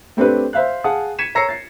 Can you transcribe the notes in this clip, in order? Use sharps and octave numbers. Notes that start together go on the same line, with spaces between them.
A3 C4 D4 G4 B4
C5 E5 F5 F#6
G#4 F5 F#5 A5 D#6
G#6 B6 C#7 D#7 E7
C#5 A#5 E6 A#6 C7 C#7
A6 C7